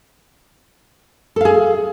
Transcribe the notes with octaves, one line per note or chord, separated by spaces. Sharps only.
G#4 A4 F5